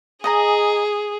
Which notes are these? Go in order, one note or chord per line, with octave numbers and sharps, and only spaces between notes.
G#4 D#5 G#5 A#5